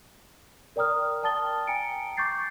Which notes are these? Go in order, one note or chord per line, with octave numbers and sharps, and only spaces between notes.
A#4 D5 G5 A#5 D#6 F6
D5 G5 A5 D#6 A6 G7
G5 G#5 A#5 C#7 D7
C#6 D6 G6 A6 C7